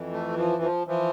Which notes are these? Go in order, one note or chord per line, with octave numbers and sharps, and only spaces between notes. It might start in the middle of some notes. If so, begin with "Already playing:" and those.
Already playing: F2 E3
A3
F3
F3
E3 F3